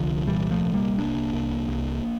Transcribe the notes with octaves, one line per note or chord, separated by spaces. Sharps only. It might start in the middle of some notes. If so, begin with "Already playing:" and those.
Already playing: C2 D3 F3
A#2 E3 G3
F3 A3
C2
G3 A#3
C2 A#3 D4
C2
C2